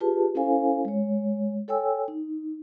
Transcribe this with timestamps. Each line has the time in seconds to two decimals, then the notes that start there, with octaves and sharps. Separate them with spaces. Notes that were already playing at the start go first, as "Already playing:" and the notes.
0.01 F4 G4 G#4 B4 A5
0.35 C#4 E4 A4 C5 F5 G#5
0.85 G#3 C#5
1.68 A4 C#5 G5 G#5 E6
2.08 D#4